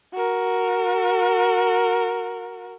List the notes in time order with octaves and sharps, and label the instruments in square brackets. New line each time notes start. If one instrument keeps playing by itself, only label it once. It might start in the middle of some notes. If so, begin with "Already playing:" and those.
[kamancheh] F#4 A#4